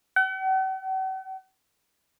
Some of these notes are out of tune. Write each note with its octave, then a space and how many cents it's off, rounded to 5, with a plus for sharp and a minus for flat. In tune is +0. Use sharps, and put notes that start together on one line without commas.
F#5 +45